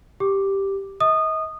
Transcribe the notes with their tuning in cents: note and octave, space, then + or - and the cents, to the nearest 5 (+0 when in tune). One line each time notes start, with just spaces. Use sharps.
G4 +0 D6 +0
D#5 +40 D#6 -20